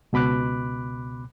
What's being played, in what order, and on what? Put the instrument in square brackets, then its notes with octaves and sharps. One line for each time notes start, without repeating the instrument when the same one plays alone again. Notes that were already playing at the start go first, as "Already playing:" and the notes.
[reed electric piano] C#2 B2 B5 D6 F#6